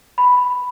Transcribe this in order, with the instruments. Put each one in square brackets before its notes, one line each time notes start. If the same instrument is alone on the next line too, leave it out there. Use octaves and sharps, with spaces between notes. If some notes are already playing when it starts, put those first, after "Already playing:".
[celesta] B5